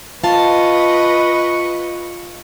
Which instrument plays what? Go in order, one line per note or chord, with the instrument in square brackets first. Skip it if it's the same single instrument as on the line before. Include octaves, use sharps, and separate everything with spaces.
[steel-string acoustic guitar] F4 A5 [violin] B4 D#5 [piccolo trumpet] C#6